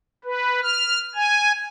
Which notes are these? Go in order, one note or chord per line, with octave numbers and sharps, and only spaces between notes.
B4
F6
G#5